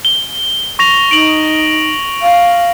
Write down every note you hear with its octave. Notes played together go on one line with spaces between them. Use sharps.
G7
C#6 A#6 F7
D#4 D7 F#7
F5